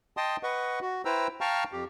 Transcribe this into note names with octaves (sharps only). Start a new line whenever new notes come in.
D#5 G5 A5 C6 D#6
B4 D#5 F#5 C#6
F#4
E4 B4 C5 G5 A#5 E6
F5 G5 A5 A#5 C#6 F6
F2 G4